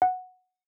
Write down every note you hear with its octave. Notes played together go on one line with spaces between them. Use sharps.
F#5